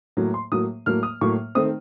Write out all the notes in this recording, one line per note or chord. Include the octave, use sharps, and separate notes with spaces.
A2 F#3 A#3
C6
A2 F#3 A#3 D#6
A2 F#3 A#3 F6
D#6
A2 F#3 A#3 C#6
D#3 A3 C4 D#6